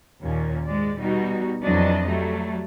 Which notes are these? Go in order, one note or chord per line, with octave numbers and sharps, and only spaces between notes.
D#2 A#2 C#4
G#2 G#3 D5
B2 G3 D#4 F#4
F2 E3 F#3 D4 D#5
F#3 G3 A3